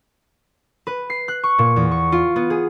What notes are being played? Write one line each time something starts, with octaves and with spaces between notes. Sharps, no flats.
B4
C7
F#6
C#6
A#2
E2
C#6
F4
B3
G#4